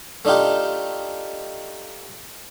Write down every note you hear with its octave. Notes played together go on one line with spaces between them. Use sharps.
A3 D4 D#4 F4 G4